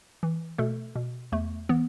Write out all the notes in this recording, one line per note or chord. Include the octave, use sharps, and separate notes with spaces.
E3
B2 A3 A4
B2
E2 A3
E3 B3